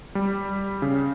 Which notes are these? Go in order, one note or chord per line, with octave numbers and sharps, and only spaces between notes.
G3
C#3